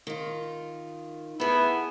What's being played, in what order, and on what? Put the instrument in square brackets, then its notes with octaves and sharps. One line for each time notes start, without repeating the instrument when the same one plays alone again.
[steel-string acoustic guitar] D#3 F4
[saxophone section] B3 E4 [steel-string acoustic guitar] G#4 A4